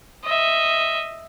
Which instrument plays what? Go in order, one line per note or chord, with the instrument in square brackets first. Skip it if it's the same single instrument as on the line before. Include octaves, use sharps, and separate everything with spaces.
[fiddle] D#5 E5